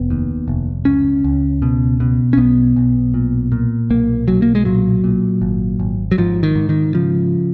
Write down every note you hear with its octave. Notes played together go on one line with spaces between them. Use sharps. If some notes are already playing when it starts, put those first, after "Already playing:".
Already playing: F1 B3
D#2
F1
C#2 C#4
C#2
B2
B2
C#4
B1 B3
B1
A#2
A#2
B1 A#3
B1 F#3
A#3
G#3
A#2 F#3
A#2
G#1
G#1
F#3
G#2 F3
D#3
G#2
D#3
C#3 F3